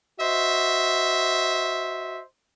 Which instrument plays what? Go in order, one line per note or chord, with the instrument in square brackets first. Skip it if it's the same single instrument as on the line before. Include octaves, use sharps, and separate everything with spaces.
[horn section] F#4 C5 D#5 E5